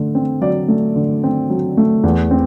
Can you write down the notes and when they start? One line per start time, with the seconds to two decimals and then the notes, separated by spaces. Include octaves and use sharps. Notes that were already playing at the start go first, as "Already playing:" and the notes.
Already playing: D3 A3
0.15 C4
0.42 F#3 D5
0.68 A3
0.96 D3
1.24 C4
1.50 F#3
1.77 A3
2.03 E2
2.31 C4